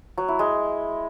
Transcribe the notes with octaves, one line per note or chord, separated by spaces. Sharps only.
F#3
E4
G#3